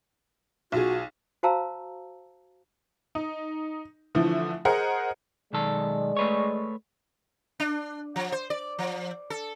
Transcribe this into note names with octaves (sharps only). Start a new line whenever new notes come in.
B1 F4 F#4 G#4
F#4 C5 F5 A5 A#5 E6
D#4
D3 E3 F3 A3
G#4 A#4 C5 D#5 F#5
B1 D#3 G#3 A4 D5
A3 B4 C#5
D4
F3
C5
D5
F3
A4